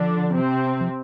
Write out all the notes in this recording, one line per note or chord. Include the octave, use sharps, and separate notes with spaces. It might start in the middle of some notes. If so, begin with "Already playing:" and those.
Already playing: D3 F3 D4
C3 C4
F3